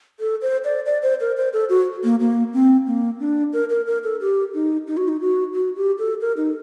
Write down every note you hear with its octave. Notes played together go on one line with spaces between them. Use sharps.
A4
C5
D5
D5
C5
A#4
C5
A4
F#4
A#3
A#3
C4
A#3
D4
A#4
A#4
A#4
A4
G4
D#4
D#4
F#4
D#4
F#4
F#4
G4
A4
A#4
D#4